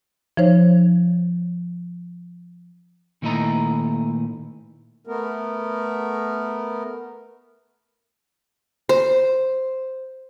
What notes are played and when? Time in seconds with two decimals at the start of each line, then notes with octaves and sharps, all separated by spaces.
0.37 F3 D#4 C5 C#5
3.22 A#2 D#3 A3 E4 D#5 A#5
5.07 A3 B3 A#4
8.89 C5